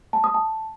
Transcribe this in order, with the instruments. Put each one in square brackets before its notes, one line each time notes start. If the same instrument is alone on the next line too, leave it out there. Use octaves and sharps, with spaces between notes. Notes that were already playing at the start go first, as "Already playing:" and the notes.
[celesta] A5
D#6
A5